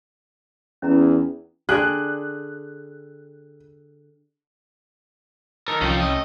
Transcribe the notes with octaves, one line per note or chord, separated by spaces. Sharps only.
E2 C#4 E4 A#5
D3 G4 G#4 F#6
D#3 D#4 A4 A#4
C2 F3 C#4 G5
A3 D#5